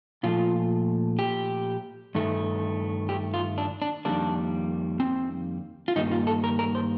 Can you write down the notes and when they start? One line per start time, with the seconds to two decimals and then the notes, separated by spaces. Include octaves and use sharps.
0.23 A#2 F3 A3 F4
1.19 G4
2.15 G2 D#3 A3
3.09 G4
3.34 F4
3.58 D4
3.82 D4
4.05 F2 D#3 G3 A#3 D4
5.00 C4
5.88 F4
5.96 G2 D#3 G3 A#3 D#4
6.11 F4
6.27 A4
6.44 A#4
6.59 A#4
6.75 C5